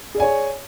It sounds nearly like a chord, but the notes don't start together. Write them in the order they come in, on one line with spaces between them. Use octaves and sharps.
G#4 D5 G#5 C#5